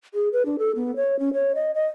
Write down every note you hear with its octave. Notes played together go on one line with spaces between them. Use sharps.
G#4
B4
D4
A4
B3
C#5
C#4
C#5
D#5
D#5